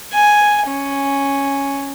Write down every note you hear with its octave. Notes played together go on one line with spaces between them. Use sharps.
G#5
C#4